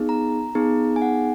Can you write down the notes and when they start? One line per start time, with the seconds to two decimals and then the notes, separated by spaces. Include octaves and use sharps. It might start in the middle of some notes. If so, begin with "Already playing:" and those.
Already playing: B3 D#4 G#4
0.09 A#5
0.55 B3 D#4 G#4
0.96 G#5
1.02 F#5